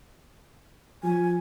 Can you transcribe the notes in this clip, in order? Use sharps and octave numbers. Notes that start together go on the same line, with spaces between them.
F3 G#5